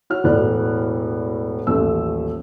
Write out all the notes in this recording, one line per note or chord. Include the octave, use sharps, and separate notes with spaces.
F#4 C#5 F6
E1 A2 F#4 D5 F#6
D#1 A1 A3 E6